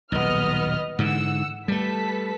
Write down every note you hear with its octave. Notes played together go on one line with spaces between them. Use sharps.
D#1 B1 B3 D#5 F6
G#2 D3 E3 F#5 E6
G3 A3 A4 B4 B6